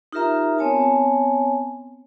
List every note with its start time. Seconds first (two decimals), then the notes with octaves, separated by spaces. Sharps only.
0.12 D#4 F4 G4 A#4 E5 A#5
0.59 B3 C4 C#5 G#5 A5